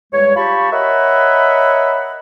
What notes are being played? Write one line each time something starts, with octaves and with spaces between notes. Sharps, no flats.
E2 G3 G#3 C#5
F4 G4 A5 B5 C#6
A#4 C#5 D#5 E5 F#5 B5